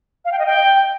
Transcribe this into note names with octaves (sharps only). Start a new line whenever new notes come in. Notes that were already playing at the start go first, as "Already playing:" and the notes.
F5
G5
D#5
G5